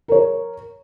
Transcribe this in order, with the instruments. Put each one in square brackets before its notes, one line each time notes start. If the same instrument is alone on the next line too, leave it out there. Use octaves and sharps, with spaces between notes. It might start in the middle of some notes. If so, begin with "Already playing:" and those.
[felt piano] A#4 C#5